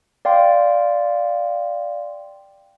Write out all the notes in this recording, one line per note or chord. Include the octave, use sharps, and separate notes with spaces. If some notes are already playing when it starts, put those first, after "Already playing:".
D5 F5 G5 C6